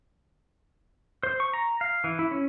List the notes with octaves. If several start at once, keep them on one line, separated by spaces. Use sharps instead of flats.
C5
C#6
A#5
F5
E3
E4
C#4